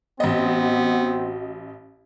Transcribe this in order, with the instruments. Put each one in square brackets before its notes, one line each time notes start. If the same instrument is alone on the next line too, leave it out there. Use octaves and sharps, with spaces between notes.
[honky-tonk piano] A1 D#5 [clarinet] B3 [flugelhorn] C4 [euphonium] F#4